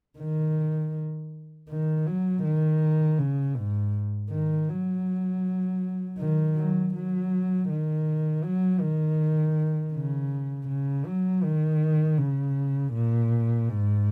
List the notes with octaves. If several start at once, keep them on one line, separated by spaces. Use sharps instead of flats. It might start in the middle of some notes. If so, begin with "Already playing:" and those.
D#3
D#3
F#3
D#3
C#3
G#2
D#3
F#3
D#3
F#3
F#3
D#3
F#3
D#3
C#3
C#3
F#3
D#3
C#3
A#2
G#2